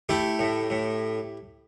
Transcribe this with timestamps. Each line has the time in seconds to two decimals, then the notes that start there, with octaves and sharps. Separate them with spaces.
0.09 A3 E4 G4
0.39 A2
0.70 A2